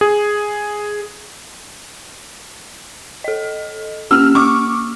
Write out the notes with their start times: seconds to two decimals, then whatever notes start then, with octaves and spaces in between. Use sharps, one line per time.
0.01 G#4
3.24 A4 D#5
4.11 A#3 C#4 G4 E6 F6
4.35 A#3 C#6 D6